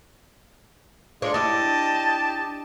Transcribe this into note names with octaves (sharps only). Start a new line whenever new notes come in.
G#3 D4 F4 C#5
D4 E4 G4 D#5 A5